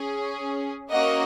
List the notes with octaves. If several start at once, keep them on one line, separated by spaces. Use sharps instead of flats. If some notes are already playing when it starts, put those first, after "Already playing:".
Already playing: C#4 G#4
A#3 C#4 F#4 D#5 F#5